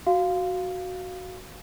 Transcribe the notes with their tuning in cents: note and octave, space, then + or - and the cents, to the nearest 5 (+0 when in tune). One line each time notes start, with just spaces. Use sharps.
F#4 +0 F5 +0